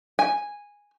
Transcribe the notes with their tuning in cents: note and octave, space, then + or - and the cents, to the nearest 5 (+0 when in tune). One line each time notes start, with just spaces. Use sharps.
G#5 -10